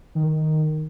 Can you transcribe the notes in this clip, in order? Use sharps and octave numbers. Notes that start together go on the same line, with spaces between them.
D#3